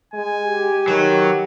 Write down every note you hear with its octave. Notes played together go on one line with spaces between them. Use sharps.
G#3 G#5
G4
D#3 F#3 B4